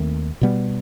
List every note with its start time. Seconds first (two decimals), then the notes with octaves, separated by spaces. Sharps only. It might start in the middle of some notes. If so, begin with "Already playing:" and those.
Already playing: D#2 D#3 A3 C4
0.41 B2 G3 B3